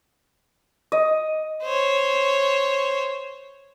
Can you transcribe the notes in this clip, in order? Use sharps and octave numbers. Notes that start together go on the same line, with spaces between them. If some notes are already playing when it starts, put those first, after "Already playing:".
D#5
C5 C#5